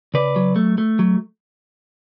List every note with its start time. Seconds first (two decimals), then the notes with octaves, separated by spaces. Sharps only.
0.14 C#3 B4 D5
0.36 F#3
0.56 A3
0.78 A3
0.99 F#3